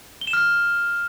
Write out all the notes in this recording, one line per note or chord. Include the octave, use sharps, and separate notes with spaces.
G7
E7
F6